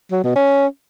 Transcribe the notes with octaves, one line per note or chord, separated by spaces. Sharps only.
F#3
B2
C#4